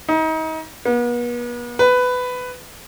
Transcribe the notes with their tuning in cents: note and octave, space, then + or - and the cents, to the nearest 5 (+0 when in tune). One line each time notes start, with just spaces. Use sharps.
D#4 +35
B3 -40
B4 +15